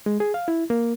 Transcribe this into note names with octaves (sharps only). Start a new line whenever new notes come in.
G#3
G#4
F5
E4
A#3